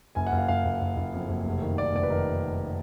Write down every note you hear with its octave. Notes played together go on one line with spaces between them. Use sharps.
F#1 G#5
F#5
F#1
F5
F#1 F5
F#1
F#1
F#1
F2
F#1
F1
D#3
F1 D5
F1 D5
B4
D#3 A#4